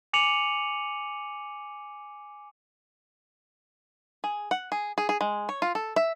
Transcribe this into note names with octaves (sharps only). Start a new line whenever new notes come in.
G#5 D6 C#7 D#7 F7 F#7
G#4
F#5
G#4
G#4
G#4
G#3
C#5
F4
A4
E5